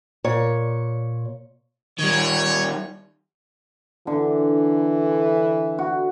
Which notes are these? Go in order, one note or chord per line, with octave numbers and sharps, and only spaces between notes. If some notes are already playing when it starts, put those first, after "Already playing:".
A#2 C#5
D#3 G3 C#5
D3 E3
E5
F#4